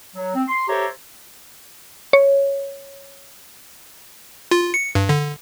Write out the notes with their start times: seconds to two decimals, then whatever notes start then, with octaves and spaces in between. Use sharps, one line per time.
0.16 F#3
0.34 C4
0.48 C6
0.68 G4 A4 C5 C#5 E5 A#5
2.13 C#5
4.51 F4
4.74 C#7
4.95 G2
5.09 D3